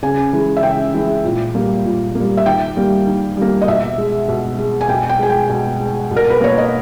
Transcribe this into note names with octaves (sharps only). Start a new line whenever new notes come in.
C#3 G#5
E3 G#3
E5
C#3 G5
E3 G#3
A#2
G3 A#3
A#2
G3 A#3
E5
D#3 G5
G3 A#3
D#3
G3 A#3
D#5
B2 E5
G#3
B2
G#3
G#5
B2 G5
G5
G#3 G#5
G5
B2
G#3
B2
A#4
B4
A#3 C#5
D#5